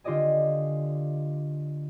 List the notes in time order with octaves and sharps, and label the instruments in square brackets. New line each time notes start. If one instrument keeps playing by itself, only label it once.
[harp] D3 F4 G4 D5 D#5 G#5